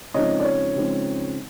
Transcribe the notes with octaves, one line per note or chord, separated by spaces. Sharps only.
C#3 F3 G#3 C4 D#4 C#5 D#5
D5
C#5
C#3 F3 G#3 C4 D#4